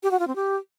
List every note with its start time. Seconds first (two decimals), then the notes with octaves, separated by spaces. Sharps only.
0.03 G4
0.11 F#4
0.19 F4
0.27 C4
0.36 G4